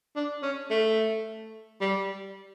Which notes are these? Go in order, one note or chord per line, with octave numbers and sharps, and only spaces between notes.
D4
C#4
A3
G3